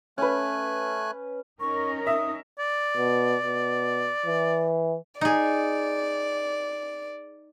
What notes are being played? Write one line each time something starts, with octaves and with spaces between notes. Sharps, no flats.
A3 C#4 B4 G#5 F#6
C#4 D#4 A#4 C#6
E5 D#6
D5
B2
B2
E3
D#4 G#4 D5